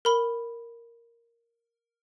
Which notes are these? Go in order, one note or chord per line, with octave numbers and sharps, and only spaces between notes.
A#4 B5 G7